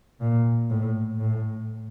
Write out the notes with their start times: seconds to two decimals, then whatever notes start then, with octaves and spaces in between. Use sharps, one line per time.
0.20 A#2
0.70 A2
1.20 A2